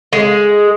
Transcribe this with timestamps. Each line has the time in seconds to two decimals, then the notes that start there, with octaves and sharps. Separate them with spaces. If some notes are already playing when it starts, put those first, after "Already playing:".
0.13 G#3